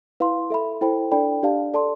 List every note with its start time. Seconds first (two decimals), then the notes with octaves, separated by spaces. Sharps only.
0.20 E4 B4 F5 C6
0.50 A4 E5 B5
0.81 E4 A4 C5 G5 B5
1.12 D4 A4 D5 G5 B5
1.43 D4 G4 D5 F5 A5
1.74 A4 D5 A5 C6